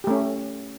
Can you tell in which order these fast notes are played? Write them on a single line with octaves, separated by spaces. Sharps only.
G4 A3 C#4